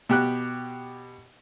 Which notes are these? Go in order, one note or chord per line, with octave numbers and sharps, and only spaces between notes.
B2 G4 F#6